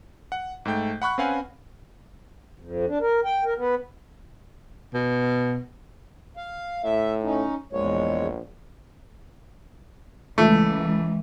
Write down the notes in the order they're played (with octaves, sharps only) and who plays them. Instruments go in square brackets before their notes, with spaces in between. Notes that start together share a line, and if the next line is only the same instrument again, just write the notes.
[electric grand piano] F#5
G#2 A3 G5 G6
F#5 B5 C#6 F#6
C4 C#4 B4 F5 F#5 G#5
[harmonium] F2
D4
A#4
G5
A#4
B3
[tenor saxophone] B2
[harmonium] F5
[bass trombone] A2 [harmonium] E5
[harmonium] C#4 D#4
[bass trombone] A#1 [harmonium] E2 G#3 C#5
[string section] C#2 E3 [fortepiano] A3